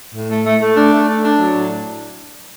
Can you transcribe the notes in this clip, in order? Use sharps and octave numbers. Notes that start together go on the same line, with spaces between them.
A2
A3
A3
A3
D4
A3
D4
D4
F#3
A2